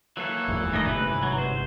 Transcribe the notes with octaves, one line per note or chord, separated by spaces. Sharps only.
E3 F#3 A#3 A4
F1 E2 G#2
D#3 G3 A3 D#5
G1 G#2 C3 B4
F#3
C5